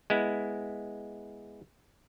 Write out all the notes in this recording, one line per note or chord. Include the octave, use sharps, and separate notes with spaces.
G#3 B3 E4